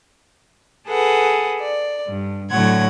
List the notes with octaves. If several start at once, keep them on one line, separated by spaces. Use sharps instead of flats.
G#4 A4 B4 F#5
D5
G2
A2 D3 F#3 C#5 F#5 G#6